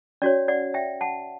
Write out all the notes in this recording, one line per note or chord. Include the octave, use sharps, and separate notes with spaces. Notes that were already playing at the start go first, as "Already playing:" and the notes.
C#4 F#4 C#5 D5
D5 F#5
E5 G5
F#5 A5